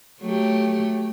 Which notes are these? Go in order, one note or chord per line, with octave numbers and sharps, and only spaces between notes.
F#3 A3 G4